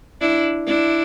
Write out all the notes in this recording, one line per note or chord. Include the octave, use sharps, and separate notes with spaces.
D4 E4
D4 E4